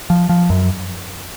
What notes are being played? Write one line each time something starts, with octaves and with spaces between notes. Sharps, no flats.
F3
F3
F#2